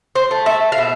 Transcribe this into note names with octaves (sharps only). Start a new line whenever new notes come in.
C5
A3
E5
F5
B2 E5